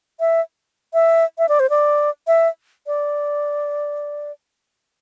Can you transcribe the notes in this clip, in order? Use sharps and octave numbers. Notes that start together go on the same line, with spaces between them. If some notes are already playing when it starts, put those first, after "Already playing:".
E5
E5
E5
D5
C5
D5
E5
D5